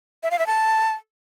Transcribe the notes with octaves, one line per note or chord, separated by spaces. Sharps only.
E5
F5
E5
A5